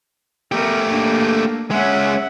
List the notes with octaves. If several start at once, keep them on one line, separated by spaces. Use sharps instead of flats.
A3 B3 G4 A#4
A#3 D4
G#3 C#4 E5 F#5